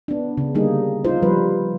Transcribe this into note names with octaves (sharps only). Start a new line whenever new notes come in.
B3 D4
C#3
D3 G3 A#3 D#4 G#4
D#4 F4 C5
F3 G3 B4